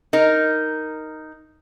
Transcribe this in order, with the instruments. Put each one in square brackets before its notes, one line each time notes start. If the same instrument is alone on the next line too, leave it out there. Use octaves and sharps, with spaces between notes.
[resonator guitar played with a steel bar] D#4 A#4